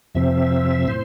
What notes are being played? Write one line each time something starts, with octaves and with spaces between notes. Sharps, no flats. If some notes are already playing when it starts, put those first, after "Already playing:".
F2 C3 F3 C4 E5
A2 C5